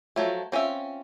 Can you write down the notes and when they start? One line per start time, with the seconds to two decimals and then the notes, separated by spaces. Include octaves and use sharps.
0.16 F3 F#3 A3
0.52 C4 C#4 F4 E5